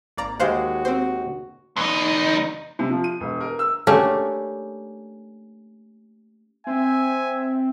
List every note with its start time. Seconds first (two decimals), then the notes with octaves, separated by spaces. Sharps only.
0.17 G#1 A#3 D5 A#5
0.40 D#2 G#3 F#4 C5 D5 F5 F#5
0.85 C4 C5
1.77 E2 D#4
2.79 C3
2.91 F3
3.04 D#7
3.20 E1
3.40 A#4
3.59 E6
3.87 A3 A#3 C#4 D4 G4
6.67 C4 E5 G#5